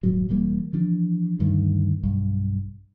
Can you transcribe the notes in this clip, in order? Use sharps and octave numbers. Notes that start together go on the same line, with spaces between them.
D#1 G#2 F#3
E1 E3 G3 A#3
E3 F3 D4
D2 G2 D#3
B1 G2